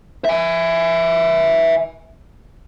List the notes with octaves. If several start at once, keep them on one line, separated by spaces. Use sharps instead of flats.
E5 G#5